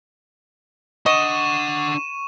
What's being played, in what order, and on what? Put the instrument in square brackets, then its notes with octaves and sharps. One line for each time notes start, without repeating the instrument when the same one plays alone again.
[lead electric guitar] D4 F#5 [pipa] D#5 [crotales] C#6 D#7 E7